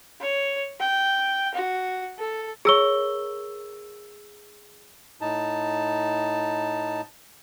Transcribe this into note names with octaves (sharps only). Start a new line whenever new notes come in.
C#5
G5
F#4
A4
G#4 A#4 C#5 E6 G7
A2 D#4 A5